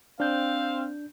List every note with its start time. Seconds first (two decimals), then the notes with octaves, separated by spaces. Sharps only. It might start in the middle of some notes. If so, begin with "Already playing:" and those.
0.20 C4 D4 F5 G6